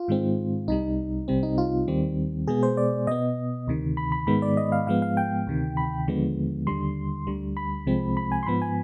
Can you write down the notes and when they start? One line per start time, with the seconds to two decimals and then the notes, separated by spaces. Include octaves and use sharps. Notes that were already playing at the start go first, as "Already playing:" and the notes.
Already playing: F4
0.08 G#2 D#3 G#3 C4
0.68 C2 C3 G3 D#4
1.28 C2 C3 G3 C4
1.43 D#4
1.58 F4
1.88 D#2 D#3 G3 C4
2.47 B2 G#3 B3 G#4
2.63 C5
2.77 D5
3.07 B2 B3 D#5
3.67 D2 C3 D#3
3.97 B5
4.12 B5
4.27 G#2 D#3 G#3 B3 B5
4.42 D5
4.57 D#5
4.72 F5
4.87 G#2 F3 G#3 B3 F5
5.02 F5
5.17 G5
5.47 D2 C3 D#3
5.77 B5
6.07 D#2 D3 F3 G#3 B3
6.67 D#2 D3 G3 C6
7.27 D2 D3 G3
7.57 B5
7.87 C2 C3 F3 G#3 C4
8.17 B5
8.32 G#5
8.43 C6
8.46 G#2 F3 B3 B5
8.62 G#5